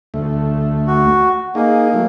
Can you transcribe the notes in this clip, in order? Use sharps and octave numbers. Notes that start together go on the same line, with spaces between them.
D2 A3
F#4
A#3 D#4 G#4
F#3 A3